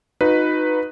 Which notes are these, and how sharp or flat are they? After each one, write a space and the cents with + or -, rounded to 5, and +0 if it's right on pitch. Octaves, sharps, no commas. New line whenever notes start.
D#4 +0 F#4 -40 B4 +0